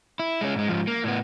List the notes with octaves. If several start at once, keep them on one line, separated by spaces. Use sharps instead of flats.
E4
G#3 C#4
G#2 G#3
G#2 F3
A#3
A2 B3